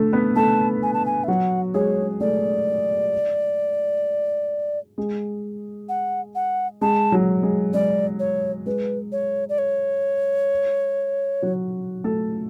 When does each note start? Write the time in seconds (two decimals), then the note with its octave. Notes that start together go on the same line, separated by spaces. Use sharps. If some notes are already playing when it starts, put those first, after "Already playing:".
Already playing: D3 A3 A4
0.13 B3 B4
0.36 A3 A4 A5
0.83 G#5
0.94 A5
1.06 G#5
1.24 E5
1.28 F#3 F#4 F#5
1.74 G#3 G#4 C#5
2.20 A3 A4 D5
4.98 G#3
5.89 F#5
6.35 F#5
6.81 G#3 A5
7.12 F#3
7.43 G#3
7.74 G#3 D5
8.19 C#5
8.66 G#3 B4
9.12 C#5
9.49 D5
9.58 C#5
11.42 F#3 F#4
12.04 A3 A4